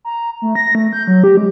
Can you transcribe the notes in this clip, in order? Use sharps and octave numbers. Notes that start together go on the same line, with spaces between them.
A#5
A3
A#6
A3
G6
F#3
G4
G#3